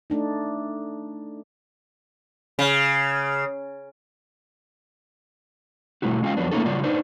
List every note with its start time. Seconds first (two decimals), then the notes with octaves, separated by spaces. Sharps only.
0.10 A3 D4 D#4
2.59 C#3
6.02 B2 G3 A3 E4 F#4
6.22 G#3 C#4 F4 F#4 F5 G5
6.37 F2 F3 F#3 B3 D4
6.51 A3 A#3 C#4 D#4 F4 A4
6.66 C#3 F#3 G3 F4 D5
6.83 D4 D#4 B4 C5